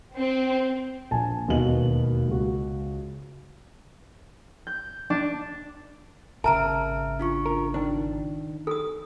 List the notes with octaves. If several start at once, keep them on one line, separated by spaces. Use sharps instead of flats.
C4
A#1 G#5 A5
E1 D#2 B3 F#4 D#5 F#7
C#2 F#4
G6
D4
G#1 C#3 A#4 E5 A5 A#5 F6 D7
D4 F4 C#6
A#4
D#3 D4 D#4
A4 D#6